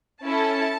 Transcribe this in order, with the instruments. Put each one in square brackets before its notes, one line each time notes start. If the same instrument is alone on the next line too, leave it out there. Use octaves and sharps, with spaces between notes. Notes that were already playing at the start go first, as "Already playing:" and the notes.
[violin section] C#4 E4 A4 A5